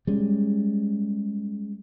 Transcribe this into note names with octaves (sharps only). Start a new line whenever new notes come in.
G3 G#3 C#4